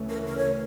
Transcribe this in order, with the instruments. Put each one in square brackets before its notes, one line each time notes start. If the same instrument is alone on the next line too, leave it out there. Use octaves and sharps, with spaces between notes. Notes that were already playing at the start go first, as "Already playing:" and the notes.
Already playing: [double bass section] D2 C#3 E3 A3 C#4
[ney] A#4
A#4
C#5